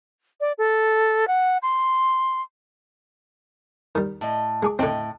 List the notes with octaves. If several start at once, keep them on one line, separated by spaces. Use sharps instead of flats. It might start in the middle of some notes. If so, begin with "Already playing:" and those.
D5
A4
F#5
C6
D#3 G3
A2 D#5
G#3 G#4 D6
A2 D3 C4 D#5 G5